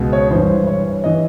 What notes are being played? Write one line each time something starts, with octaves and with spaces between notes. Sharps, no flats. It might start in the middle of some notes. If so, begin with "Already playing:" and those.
Already playing: C#2 B2
C#5
G2 E3 C5
C#5
E3 D#5